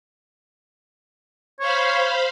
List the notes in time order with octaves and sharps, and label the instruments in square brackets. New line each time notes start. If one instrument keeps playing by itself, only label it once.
[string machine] C5 F5 B5 [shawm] C#5